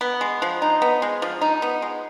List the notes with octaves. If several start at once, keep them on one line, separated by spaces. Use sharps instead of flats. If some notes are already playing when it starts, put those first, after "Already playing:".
B3
G#3
F3
D#4
B3
G#3
F3
D#4
B3
G#3